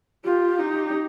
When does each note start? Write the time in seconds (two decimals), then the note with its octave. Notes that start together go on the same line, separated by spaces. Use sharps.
0.24 F4 G4
0.59 D#4